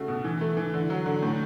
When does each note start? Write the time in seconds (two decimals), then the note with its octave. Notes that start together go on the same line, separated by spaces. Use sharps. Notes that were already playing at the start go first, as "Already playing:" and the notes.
Already playing: C#3 A3 F#4
0.08 B2
0.24 E3
0.41 A3
0.57 E3
0.74 D3
0.90 F#3
1.06 D3
1.22 A2